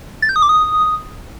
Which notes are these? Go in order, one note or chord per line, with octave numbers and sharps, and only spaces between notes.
A6
G6
D#6
D6
D#6